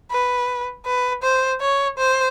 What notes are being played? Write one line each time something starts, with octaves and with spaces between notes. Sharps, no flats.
B4
B4
C5
C#5
C5